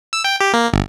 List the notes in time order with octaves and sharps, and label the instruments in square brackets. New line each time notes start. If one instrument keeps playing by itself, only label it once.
[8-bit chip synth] E6
G5
G4
A#3
G1